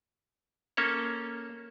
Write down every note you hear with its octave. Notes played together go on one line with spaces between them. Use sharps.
A#3 C#4 A4 C#5